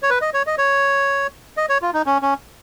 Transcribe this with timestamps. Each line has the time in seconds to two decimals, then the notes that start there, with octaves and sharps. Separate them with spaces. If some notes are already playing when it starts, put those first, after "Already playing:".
0.03 C#5
0.10 B4
0.22 D#5
0.34 C#5
0.47 D#5
0.58 C#5
1.57 D#5
1.69 C#5
1.82 F4
1.94 D#4
2.06 C#4
2.22 C#4